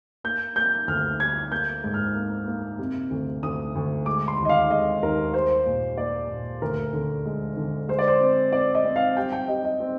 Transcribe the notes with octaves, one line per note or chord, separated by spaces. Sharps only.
A#3 G6
A#3 G6
D2 F6
G3 G#6
A#3 G6
G#2
F6
A#3
A#3
C3
D2
D2 D#6
D2
G#3 D6
C6
D#2
D#5
F5
G#3 D#5
D#2 A#4
G3 C5
A#2
A#3 D5
A#2
D2 A#4
D3
G#3
D3
G#3 C5
D5
C5
C4
C4 D5
D#5
C4
F5
G3 G5
G5
G3 D#5
D#5
C4